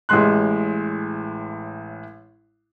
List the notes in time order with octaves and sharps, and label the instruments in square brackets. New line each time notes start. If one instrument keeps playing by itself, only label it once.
[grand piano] A1 A2 G3 G#3 C6 F#6